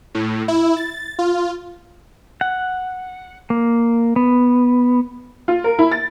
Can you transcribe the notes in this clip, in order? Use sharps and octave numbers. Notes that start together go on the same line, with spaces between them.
A2
E4
A6
F4
F#5
A#3
B3
F4
A#4
E4
A6